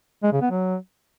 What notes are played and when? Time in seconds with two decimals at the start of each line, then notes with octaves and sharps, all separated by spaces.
0.23 G#3
0.32 C#3
0.42 B3
0.51 F#3